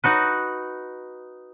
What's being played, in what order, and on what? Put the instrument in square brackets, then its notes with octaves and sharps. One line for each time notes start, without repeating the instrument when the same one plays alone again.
[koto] D#4 F#4 B4